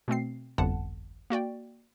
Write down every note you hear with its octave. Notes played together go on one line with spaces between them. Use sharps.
B2 A3 C4 C7
G1 C2 F2 D3 F#5 A5
A#3 F#4 D5 G5